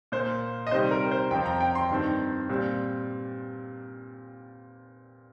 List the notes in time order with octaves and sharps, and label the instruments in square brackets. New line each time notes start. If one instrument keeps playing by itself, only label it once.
[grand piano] A#2 A#3 C5
D#5
C3 D#3 G3 C5
A#4
C5
F2 F3 C4 G5
A#5
G5
C6
G2 D#3 C4
A#2 G3 C4